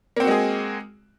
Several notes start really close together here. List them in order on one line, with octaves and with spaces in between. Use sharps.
A#3 C4 F#4 G#3 G#4